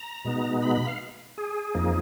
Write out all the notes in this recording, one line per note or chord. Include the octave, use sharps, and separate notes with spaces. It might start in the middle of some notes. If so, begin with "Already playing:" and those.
Already playing: A#5
B2 G#3 B3 D#4
B5
B5
F5
G#4
F2 F3 A#3 D#4